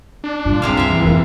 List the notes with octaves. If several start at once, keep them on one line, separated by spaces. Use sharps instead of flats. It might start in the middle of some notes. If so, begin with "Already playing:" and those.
D4
G2 A#2 F4
C3 G#3 F5
C#2 E5 F5
E3
F2 A#3 A#4